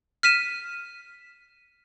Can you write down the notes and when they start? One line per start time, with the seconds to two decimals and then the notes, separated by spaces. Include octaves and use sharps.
0.23 F6 B6 D#7 E7